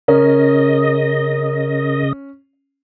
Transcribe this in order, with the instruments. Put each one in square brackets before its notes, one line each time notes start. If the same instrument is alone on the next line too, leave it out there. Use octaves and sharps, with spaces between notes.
[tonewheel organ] C#3 D#5 [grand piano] C#4 [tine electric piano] A#4